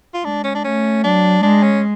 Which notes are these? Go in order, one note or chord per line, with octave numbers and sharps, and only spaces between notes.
F4
G#3 D4
C#4
D4
A3 C#4
F#3 D4
G#3 D4
C#4